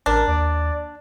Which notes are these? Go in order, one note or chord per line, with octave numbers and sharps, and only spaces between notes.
A1 D4 A#4
D#2 D5